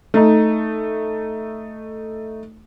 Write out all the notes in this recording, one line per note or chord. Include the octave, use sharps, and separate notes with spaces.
A3 D#4